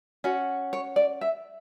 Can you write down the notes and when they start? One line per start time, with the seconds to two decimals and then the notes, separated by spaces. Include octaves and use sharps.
0.24 C#4 F#4
0.73 C#5
0.96 D5
1.21 E5